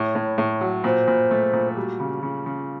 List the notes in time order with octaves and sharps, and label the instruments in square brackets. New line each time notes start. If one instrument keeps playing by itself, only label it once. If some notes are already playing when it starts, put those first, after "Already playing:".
Already playing: [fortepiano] A2 [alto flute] C#5
[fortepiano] A2
A2
F#3
[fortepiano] A#2 [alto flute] C5
[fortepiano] A#2
A3
A#2
[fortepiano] G3 [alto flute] F#4
[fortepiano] C#3
[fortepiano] C#3 [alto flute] F4
[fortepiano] C#3